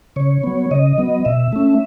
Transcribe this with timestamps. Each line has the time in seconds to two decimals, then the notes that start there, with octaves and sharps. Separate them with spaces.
0.16 C#3 C#5
0.44 F#3 B3
0.71 C#3 D#5
0.98 F#3 B3
1.25 B2 E5
1.53 A3 C#4